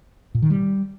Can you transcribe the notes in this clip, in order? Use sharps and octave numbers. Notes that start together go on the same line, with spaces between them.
A#2
D#3
G3